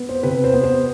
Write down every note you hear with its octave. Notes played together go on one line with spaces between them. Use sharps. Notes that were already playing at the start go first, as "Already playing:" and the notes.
Already playing: B3
C5
C3 B4
C5
B3
C5